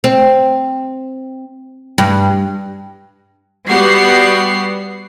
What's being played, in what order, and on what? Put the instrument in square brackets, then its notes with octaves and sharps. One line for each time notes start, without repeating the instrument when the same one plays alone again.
[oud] C4
G2
[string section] G3 B3 F#4 G4 F#5 C7